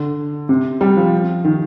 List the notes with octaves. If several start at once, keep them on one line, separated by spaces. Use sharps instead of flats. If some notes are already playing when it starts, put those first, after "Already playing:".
Already playing: D3
C3
G3
F3
D#3